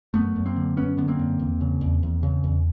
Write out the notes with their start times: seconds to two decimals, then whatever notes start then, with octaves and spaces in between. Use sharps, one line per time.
0.14 F#2 A3 B3
0.36 F#2
0.46 A#3 C4
0.56 D3
0.77 F#2 B3 C#4
0.97 D3 B3
1.08 A#3 C4
1.19 F#2
1.39 E2
1.61 C#3
1.81 E2
2.03 E2
2.23 C#3
2.44 E2